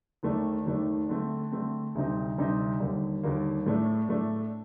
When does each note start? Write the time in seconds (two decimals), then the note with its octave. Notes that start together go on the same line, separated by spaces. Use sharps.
0.23 D#2 D#3 A3 D4
0.66 D#2 D#3 A3 D4
1.09 D3 A3 C4
1.52 D3 A3 C4
1.95 D2 C3 G3 C4 D#4
2.38 D2 C3 G3 C4 D#4
2.80 D#2 D3 G3 A#3
3.23 D#2 D3 G3 A#3
3.66 A2 A3 D4
4.09 A2 A3 D4